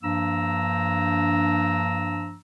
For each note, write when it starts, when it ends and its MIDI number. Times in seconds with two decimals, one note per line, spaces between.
0.02 2.35 43
0.02 2.35 53
0.02 2.35 58
0.02 2.35 62
0.02 2.35 82
0.02 2.35 88